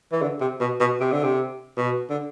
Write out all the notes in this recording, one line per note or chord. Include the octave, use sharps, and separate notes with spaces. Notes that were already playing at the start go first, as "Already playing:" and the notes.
E3
D3
C3
B2
B2
C3
D3
C3
B2
D3